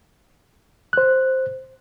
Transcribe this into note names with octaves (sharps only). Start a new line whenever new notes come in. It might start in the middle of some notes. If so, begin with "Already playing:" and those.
C5 F#6